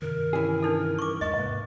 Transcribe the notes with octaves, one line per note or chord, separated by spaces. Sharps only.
G2 C3 D#3 A#4
E3 C#4 G#4
D4 D#4 A4
G2 C#6 D6
E2 G2 G#3 D#5 C#6
G#2 C3 A#3 B4